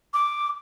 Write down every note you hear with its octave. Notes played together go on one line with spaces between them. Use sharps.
D6